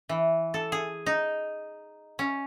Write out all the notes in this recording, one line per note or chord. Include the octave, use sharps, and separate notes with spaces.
E3
A4
G#4
D#4
C#4